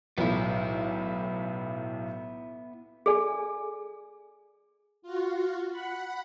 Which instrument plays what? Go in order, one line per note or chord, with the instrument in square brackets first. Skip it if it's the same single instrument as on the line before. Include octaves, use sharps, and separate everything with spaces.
[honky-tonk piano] B1 A2 [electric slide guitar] B3 E4
[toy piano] G#4 A4 D5 G#5
[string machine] F4 F#4
F#5 B5